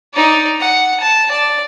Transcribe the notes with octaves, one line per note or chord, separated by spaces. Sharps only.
D#4 D5
F#5
A5
D5